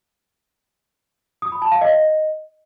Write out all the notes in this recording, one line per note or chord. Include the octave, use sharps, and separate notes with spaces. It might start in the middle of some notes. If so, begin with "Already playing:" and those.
D#6
B5
A5
F5
D#5